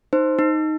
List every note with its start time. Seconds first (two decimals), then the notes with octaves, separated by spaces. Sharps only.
0.13 D#4 C5
0.39 D#4